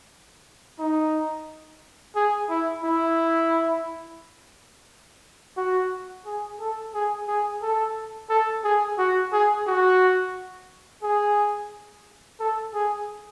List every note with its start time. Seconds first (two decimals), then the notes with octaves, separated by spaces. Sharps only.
0.79 D#4
2.16 G#4
2.50 E4
2.84 E4
5.57 F#4
6.26 G#4
6.60 A4
6.94 G#4
7.28 G#4
7.62 A4
8.30 A4
8.64 G#4
8.98 F#4
9.33 G#4
9.67 F#4
11.03 G#4
12.40 A4
12.74 G#4